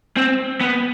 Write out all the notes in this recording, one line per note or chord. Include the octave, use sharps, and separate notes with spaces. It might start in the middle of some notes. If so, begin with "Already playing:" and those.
C4
B3